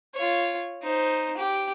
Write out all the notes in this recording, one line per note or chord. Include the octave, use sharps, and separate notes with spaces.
F4 C#5
D#4 C5
G4